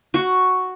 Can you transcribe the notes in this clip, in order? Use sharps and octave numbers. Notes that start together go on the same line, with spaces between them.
F#4